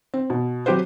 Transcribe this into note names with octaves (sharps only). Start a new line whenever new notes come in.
C4
B2
F#3 C4 G4 B4 C5